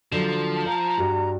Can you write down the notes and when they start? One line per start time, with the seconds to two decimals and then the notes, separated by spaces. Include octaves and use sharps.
0.12 D3 F3 F#3
0.66 F5 A#5
0.98 G2 F#4 G4